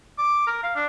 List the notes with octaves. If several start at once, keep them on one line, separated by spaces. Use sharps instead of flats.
D6
A#4
F5
D4